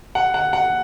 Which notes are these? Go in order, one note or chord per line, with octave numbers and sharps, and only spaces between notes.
F#5
F#5
F#5